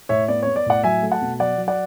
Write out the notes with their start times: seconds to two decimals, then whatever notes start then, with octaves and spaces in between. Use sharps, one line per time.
0.09 A2 C#5 E5
0.28 B3 D5
0.43 B3 C#5
0.56 D5
0.66 A2 D5 F#5
0.83 F#3 E5 G#5
1.02 A3
1.12 F#5 A5
1.22 B2
1.40 F#3 D5 F#5
1.58 F#3
1.68 D5 F#5